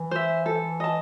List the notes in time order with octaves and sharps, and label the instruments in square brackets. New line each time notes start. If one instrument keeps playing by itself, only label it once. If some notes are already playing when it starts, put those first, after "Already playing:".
Already playing: [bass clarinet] E3
[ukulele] C5 E5
A4
D#5 A5